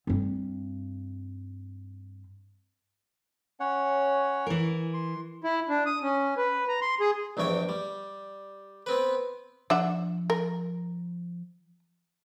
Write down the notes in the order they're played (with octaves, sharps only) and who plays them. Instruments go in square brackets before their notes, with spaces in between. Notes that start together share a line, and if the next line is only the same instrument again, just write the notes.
[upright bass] G2 C4
[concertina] C#4 C#5 F#5
[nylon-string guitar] E3 A#4
[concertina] C6
[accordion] E4
D4
D#6
C#4
B4
A#5
C6
G#4
[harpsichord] A#1 E2 G2 C#5 G5
G3
B3 C4 B4
[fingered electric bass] F3 [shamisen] D4 E5 F#5
[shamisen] A#4